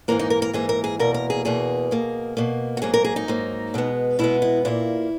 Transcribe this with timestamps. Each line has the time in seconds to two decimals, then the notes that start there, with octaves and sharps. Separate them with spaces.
0.08 G#2 E3 A#3 A#4
0.19 D#4
0.30 A#4
0.42 A#4
0.53 G#2 E3 A#3 G#4
0.69 A#4
0.84 G#4
0.99 E2 B2 A#3 A#4
1.14 A#4
1.30 G#4
1.45 E2 B2 A#3 G#4
1.91 B2 A#3
2.37 B2 A#3
2.77 F#4
2.82 G#2 F#3 A#3 G#4
2.94 A#4
3.04 G#4
3.16 D#4
3.28 G#2 F#3 A#3
3.74 B2 G#3 B3
4.19 B2 G#3 B3 E4
4.42 E4
4.65 A#2 A#3 E4